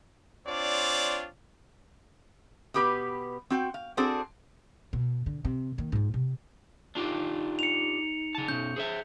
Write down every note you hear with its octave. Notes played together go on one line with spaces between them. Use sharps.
C4 D4 F4 C#5 D5
B2 B3 G4 B4
C4 F#4 G5
F5
C4 D4 F#4 G#4 A4 C5
B2
D3
C3
D#3 A#3
G#2 F4
C3
D4 D#4 F4 G4
C#7 F7
C#3 A5
B2 C#4 G6
G#4 C5 E5